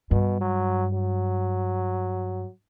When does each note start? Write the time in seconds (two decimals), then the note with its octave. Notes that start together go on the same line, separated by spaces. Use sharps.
0.11 G2 B2
0.41 F#3
0.94 F#3